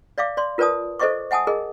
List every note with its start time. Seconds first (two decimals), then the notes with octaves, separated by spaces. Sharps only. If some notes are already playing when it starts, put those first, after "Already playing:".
0.18 D5 E5 F5 D6
0.37 D5 C6
0.58 F4 A#4 B4 D5 A5 D#6
0.99 A4 C5 D#5 E5 C#6 D6
1.31 E5 F#5 G#5 A5 D#6
1.47 G#4 A#4 D#5